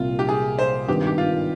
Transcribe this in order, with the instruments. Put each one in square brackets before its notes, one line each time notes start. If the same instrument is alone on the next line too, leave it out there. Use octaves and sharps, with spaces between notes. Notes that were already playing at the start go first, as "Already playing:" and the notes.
Already playing: [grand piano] C2 A#2 G3 [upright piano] F4
[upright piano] G4
G#4
C5
[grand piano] G#1 G2 D#3 [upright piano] G4
[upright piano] G4
F4